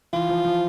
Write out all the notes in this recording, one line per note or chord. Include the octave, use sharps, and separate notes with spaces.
E3 F4
F3
F3